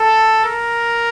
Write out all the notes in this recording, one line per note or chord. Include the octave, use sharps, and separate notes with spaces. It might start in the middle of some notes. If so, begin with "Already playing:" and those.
Already playing: A4
A#4